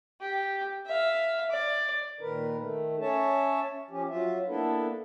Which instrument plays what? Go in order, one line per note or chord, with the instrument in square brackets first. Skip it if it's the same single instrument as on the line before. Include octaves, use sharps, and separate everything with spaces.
[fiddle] G4
E5 F5
D5
[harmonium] A#2 D#3 A#4 B4
D#3 A3
C#4 C#5 E5 A5
F3 C#4 G4
F#3 F4 E5
A#3 B3 D4 E4 A4 B4